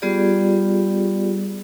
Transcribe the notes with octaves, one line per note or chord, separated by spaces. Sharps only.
G3 B3 F4 G4 G#4 D5